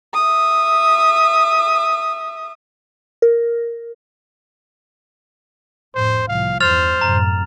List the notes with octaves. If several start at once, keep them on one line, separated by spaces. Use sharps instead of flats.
E5 D#6
A#4
F2 A2 C5
C2 A2 F3 F5
E2 G2 C5 F6 A6 F7
F#2 A2 C3 A#5